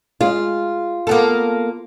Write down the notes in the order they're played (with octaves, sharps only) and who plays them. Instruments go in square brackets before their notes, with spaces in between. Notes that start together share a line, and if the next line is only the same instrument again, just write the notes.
[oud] G#3 [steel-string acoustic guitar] F4
[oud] A#3 B3 A4